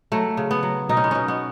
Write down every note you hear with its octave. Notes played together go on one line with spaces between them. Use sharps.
F#3 A3
C#3
B3
F#3
B2 D#4
C#4
B3
B2 C#4
B3